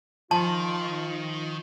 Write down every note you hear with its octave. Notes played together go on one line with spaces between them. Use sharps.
D#3 F3 F4 A5